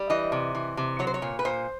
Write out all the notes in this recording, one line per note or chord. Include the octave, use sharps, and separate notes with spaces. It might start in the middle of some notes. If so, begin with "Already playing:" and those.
Already playing: G3
E3 D#5
C3
E3
C3
F#3 C#5
C5
C#5
A#2
B4
A#2 C5